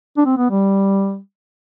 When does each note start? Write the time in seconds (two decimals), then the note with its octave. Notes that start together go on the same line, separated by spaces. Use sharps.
0.17 D4
0.26 C4
0.37 B3
0.51 G3